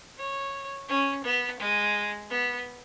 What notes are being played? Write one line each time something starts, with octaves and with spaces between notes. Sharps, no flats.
C#5
C#4
B3
G#3
B3